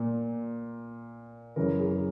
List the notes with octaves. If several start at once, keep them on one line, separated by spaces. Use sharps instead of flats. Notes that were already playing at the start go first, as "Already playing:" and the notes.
Already playing: A#2
F#2 C#3 E3 A#4
G#4